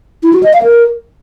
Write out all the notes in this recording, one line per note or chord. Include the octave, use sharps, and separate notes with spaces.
E4
F#4
D#5
F5
A#4